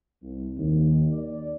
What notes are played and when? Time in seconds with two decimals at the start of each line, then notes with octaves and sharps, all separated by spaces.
0.22 C2
0.58 D#2
1.12 D5